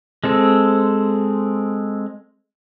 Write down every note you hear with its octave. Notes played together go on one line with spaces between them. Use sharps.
G#3 C4 A4